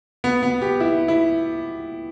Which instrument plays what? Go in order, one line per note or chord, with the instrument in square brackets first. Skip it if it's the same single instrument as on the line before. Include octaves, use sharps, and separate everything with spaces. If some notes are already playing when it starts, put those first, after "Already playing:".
[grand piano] B3
B3
G4
E4
E4